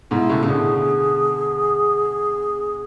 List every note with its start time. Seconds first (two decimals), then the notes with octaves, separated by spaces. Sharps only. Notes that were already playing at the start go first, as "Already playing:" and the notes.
0.11 G#2 B2 E4
0.29 A2 C#3
0.43 C#3 A4
0.48 B2 D3 G#4